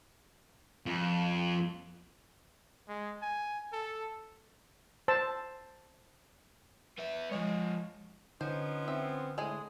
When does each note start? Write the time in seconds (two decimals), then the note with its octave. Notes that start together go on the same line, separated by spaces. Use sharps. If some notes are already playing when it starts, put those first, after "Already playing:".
0.86 F2
2.88 G#3
3.22 G#5
3.73 A4
5.08 C5 A5 E6
6.98 B3 E5
7.31 F3 G#3 C#5
8.41 D3 F3 B3 C#4 D#4 C5
8.88 C4 E5
9.38 A2 G#3 G#4